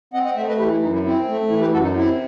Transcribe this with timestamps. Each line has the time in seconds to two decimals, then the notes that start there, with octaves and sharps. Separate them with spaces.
0.13 C4 D#5 F#5
0.25 D#5 F#5
0.36 A3 C5 E5
0.48 B4 D#5
0.59 E3 G4 B4
0.71 E4
0.81 F#2 D#4
0.93 E4
1.04 C4 E4
1.28 A3
1.49 E3 E4
1.61 G4 B4
1.73 F#2 F#4 A4
1.83 D#4
1.95 C3 E4